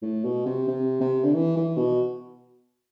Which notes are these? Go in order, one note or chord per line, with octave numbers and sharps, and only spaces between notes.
A2
B2
C3
C3
C3
D3
E3
E3
B2